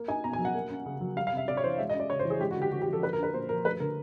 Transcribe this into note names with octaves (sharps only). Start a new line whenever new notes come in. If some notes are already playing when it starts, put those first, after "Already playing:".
Already playing: A#3
D#4 G#5
B2 A#5
G#5
F#3
F#5
A#3
C#4
C#3
F#3
G3 F5
F5
C3
E5
C3 D5
C#5
E3 C5
G#3 E5
D#5
C#4
D5
C#3 C#5
C5
E3
G#4
G#3 G4
F#4
D3
G4
D3 F#4
G4
F3
A4
A#3 B4
A#4
D4 B4
A#2 C5
F3 A#4
A3 B4
D3 A#4